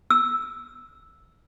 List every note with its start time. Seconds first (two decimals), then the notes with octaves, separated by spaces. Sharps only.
0.10 E6